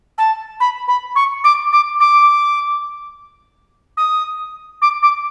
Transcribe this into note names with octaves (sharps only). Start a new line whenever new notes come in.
A5
B5
B5
C#6
D6
D6
D6
D#6
D6
D6